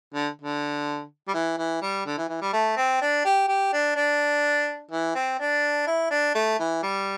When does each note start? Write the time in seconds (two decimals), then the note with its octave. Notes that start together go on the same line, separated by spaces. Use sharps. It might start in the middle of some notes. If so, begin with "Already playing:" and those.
0.14 D3
0.41 D3
1.28 G3
1.34 E3
1.58 E3
1.82 G3
2.06 D3
2.18 E3
2.29 E3
2.41 G3
2.53 A3
2.77 C4
3.01 D4
3.25 G4
3.48 G4
3.73 D4
3.96 D4
4.91 E3
5.15 C4
5.39 D4
5.87 E4
6.10 D4
6.35 A3
6.59 E3
6.83 G3